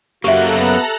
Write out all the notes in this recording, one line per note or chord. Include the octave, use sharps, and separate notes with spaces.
F#2 A#3 F#4 G4 A4 E5 A#5 F#6
B3